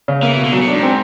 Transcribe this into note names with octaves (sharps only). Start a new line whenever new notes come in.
C#3
E3 A#3
B2
D3
C#3 F#3
A2
D4
G#2
C4